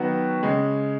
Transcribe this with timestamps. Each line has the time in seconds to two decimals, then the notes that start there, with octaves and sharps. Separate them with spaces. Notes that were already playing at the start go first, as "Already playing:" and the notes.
Already playing: D#3 F#3 B3 F#4
0.43 C#3 G#3